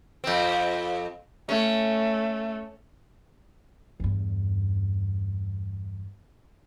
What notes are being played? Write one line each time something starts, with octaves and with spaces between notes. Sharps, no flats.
F2 C4
A3 C#4
E2 G2